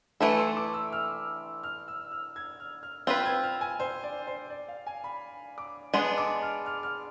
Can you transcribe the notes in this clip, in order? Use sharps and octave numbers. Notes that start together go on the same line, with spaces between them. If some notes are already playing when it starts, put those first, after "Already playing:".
E3 A3 E4 A4 B5
C6
D6
E6
F6
F6
E6
F6
G#6
F6
F6
C4 F4 B4 E6
G#6
F6
G#5
C5
D5
C5
D5
F5
G#5
B5
D6
G#3 B3 D4 C6
D6
F6
F6
F6